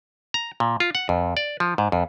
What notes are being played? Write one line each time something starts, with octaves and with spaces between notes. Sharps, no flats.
A#5
A#2
F4
F#5
F2
D5
F3
G#2
F2